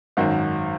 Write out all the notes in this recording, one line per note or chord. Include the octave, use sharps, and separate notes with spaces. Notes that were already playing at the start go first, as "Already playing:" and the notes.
G#1 F#2 D#3 F#4